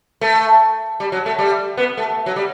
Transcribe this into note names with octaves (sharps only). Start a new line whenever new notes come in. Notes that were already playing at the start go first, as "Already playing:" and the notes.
A3
G3
F#3
A3
G3
B3
A3
F#3
G3